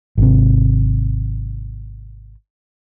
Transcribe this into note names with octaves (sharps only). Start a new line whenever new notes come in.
G#1 C3